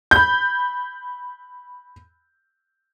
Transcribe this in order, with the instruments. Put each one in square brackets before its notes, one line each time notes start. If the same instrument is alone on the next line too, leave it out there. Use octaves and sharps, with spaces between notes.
[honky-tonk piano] B5 G6